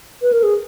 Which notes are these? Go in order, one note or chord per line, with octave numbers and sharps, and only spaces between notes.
B4
A#4
G#4